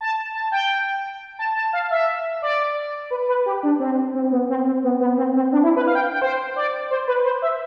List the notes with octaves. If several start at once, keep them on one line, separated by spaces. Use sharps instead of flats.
A5
A5
G5
A5
A5
F5
E5
D5
B4
B4
G4
D4
C4
C4
B3
C4
C4
B3
B3
C4
C4
D4
E4
B4
F5
G5
G5
C5
D5
C5
B4
C5
E5